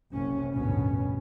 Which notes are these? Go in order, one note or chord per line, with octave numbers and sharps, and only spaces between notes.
F#1 C2 C3 C#4
A1 D2 G2 B2 B3 C#4